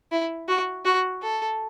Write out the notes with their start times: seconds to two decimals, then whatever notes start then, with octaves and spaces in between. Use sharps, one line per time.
0.12 E4
0.48 F#4
0.85 F#4
1.22 A4